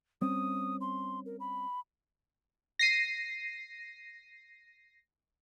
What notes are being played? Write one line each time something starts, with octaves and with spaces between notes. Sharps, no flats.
G3 C4 C#4 D#6
C6
A#4
B5
A#6 C7 D#7